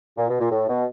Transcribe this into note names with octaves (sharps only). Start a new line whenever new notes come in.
A#2
B2
A#2
A2
B2